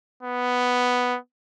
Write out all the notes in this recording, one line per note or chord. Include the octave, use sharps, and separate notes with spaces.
B3